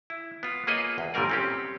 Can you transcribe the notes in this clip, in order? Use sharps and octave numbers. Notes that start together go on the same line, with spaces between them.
E4
B3 F4
A#3 F4 G#4 B4 C#5 D#5
E2
G1 A#2 E3 G3 A#4 D5
C4 C#4 G4